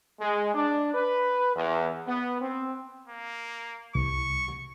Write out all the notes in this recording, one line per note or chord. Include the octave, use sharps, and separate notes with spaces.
G#3
D4
B4
E2
B3
C4
A#3
C2 C#6